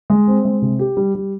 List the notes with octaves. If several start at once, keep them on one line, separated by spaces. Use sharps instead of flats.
G#3
C4
G#3
C3
G4
G3
G3